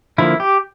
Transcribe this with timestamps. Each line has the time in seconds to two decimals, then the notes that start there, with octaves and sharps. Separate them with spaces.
0.18 D3 F3 A#3 E4
0.40 G4